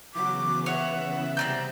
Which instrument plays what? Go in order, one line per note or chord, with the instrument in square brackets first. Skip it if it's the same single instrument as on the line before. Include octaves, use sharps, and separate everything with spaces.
[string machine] C#3 E3 B3 [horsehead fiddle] F#3 F#4 [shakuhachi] D6
[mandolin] C#5 [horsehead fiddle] E5 [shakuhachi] F#5
[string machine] C3 G3 G4 [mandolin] C4 D5 G6 [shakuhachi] A#5